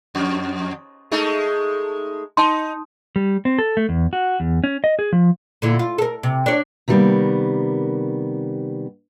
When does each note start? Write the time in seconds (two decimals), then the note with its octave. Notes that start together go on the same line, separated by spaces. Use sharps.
0.15 F2
1.12 G#3 A3 D#4
2.37 D#4 A5 C6
3.16 G3
3.45 C4
3.59 A4
3.77 A3
3.89 E2
4.13 F#4
4.40 E2
4.64 C#4
4.84 D#5
4.99 G#4
5.13 F3
5.62 A#2 D3 E4
5.79 F4
5.98 A4 A#4
6.23 C3
6.46 D4 C#5
6.88 C3 D#3 F#3 G3 A#3 B3